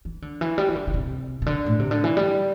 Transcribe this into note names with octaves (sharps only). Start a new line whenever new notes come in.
E3
D3
E3
G3
E3
D3
D3
C3
C3
D3
A2
C3
D3
E3
G3